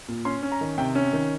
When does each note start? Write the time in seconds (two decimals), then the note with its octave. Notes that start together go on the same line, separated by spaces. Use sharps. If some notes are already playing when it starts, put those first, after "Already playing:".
0.08 A#2
0.25 C#4 C6
0.43 C#4
0.52 A#5
0.61 D#3
0.78 C3 G5
0.95 C#4
1.13 D#3